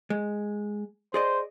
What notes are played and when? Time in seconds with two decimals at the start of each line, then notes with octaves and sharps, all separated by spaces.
0.10 G#3
1.14 G#4 C5 D5 D#5